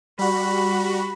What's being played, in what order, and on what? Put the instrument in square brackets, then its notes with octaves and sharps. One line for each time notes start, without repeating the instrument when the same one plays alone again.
[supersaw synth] G3 F#4 [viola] B5